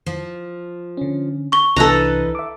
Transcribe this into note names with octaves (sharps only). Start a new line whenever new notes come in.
F3
D3 C#4
C#6 G7
C2 E3 D4 D#4 A4 B4 A#5 F#6
E5 D6